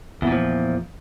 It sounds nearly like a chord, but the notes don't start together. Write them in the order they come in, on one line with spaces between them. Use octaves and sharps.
E2 A#2 F3